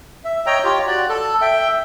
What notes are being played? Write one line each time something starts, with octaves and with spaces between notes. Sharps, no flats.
E5
C#5 D#5 G5 A#5
F4 G4 C#5
F#4 D5
A4
E5 G5